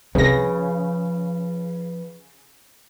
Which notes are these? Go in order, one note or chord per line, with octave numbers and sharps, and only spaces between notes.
C2 C#3 F3 B4 A#6